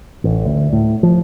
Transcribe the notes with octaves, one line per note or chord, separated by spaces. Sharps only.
A1
D2
A2
F3